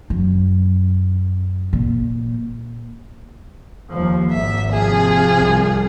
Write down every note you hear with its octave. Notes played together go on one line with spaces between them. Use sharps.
F#2
A#2
D#2 F3
G#1 A#3 E5
C3 F3 G#4
C2